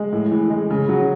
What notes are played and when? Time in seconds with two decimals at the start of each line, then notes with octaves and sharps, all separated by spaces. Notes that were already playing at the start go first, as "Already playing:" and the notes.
Already playing: G#3
0.13 A2
0.31 E3
0.50 G#3
0.70 C#3
0.89 F#3